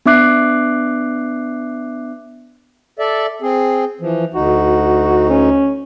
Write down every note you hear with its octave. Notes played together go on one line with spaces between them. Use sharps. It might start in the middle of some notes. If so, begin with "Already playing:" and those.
B3 D4 E5 D6 F#6 C7
A4 D5 E5
C4 G#4
E3 F3
D2 D#4 F#4
C#4